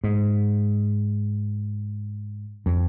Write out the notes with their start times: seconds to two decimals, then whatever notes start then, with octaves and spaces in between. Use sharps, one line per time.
0.04 G#2
2.66 F2